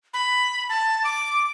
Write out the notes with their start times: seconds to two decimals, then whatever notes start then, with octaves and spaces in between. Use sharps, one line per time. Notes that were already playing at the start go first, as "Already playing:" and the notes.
0.14 B5
0.69 A5
1.04 D6